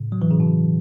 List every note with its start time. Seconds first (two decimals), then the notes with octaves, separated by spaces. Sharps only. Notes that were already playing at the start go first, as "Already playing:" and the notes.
Already playing: A2 C#3
0.12 F#3
0.22 E3
0.31 C#3
0.40 B2